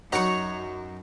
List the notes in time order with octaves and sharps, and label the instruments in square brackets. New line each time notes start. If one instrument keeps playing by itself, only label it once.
[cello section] F#2 [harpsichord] D#4 F#4 [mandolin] C#5 C#6